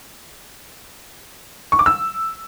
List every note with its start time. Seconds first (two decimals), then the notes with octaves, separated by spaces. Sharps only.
1.72 C#6
1.79 D6
1.86 E6